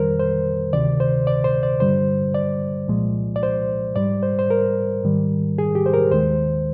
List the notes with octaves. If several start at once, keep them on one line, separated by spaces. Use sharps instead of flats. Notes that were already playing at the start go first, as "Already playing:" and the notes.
Already playing: F2 D#3 G3 A#4 C5
C5
D2 C3 D#3 D5
C5
D5
C5
D5
G2 D3 G3 C5
D5
C2 A#2 F3 G#3
D5
C5
G#2 G3 D5
C5
C5
A#4
G#2 D#3 G3
G#4
G4
C5
A#4
D#2 D#3 G#3 C5